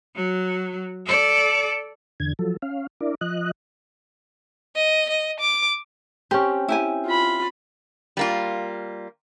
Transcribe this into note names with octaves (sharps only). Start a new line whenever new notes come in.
F#3
A4 D5
E2 D3 G#6
F3 F#3 A4
C#4 F5
D4 E4 A#4 D5
F3 D#5 F#6
D#5
D#5
D6
C4 C#4 G4
E4 G4 G#5
F4 B5
G3 A#3 F4